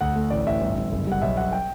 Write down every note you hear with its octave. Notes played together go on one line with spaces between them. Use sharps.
D2 F#5
A3
A1 D5
A1 E5
G1
G1
F#1
G3 F#5
B1 E5
B1 F#5
G5